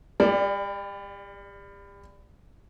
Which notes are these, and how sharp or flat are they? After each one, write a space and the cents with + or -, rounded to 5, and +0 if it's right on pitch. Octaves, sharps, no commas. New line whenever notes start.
G3 +35 D5 +5